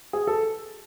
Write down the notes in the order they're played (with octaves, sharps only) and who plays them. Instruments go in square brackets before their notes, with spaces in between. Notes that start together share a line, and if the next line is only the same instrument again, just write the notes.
[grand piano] G#4
A4